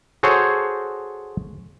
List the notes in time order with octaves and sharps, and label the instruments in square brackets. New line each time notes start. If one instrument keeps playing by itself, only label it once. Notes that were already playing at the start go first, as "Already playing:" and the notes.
[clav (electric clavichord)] F#4 G#4 A4 C5 C#5